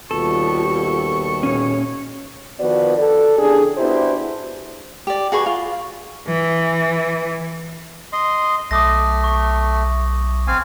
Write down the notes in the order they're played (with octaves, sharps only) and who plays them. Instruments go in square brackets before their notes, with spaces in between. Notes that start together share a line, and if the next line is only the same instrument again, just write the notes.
[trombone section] D#2 B2 G3 [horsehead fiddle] F4 G4 [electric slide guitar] A4 [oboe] C#6
[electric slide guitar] A#2 C#4 [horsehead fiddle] G#4 C#5
[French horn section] D#3 F3 B3 F#4 B4 D5
A4 D5
E2 C#3 D4 G4 G#4
B3 D4 E4 F#4 G4 C5
[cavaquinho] G4 D5
F#4 G#4 B4 C#6
F4
[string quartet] E3
[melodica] D#5 C6
[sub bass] B1 [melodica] A3 [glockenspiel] D6 D#6 A#6
[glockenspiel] C#6
[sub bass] A1 [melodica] C4 F5 G#5